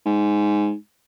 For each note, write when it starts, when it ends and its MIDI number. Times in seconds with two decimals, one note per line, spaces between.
0.06 0.74 44